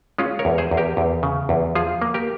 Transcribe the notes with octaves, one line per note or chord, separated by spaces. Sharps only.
G#3 C#4 F4
A#4 C#5
E2
G#4 C5
E2
G4 A#4
E2
C#3
E2
F3 F4 G#4
A#3
G4 A#4